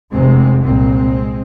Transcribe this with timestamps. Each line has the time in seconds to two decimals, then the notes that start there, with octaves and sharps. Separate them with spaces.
0.12 F1 E2 C3 G#3 C4
0.63 C2 A#2 G#3 C4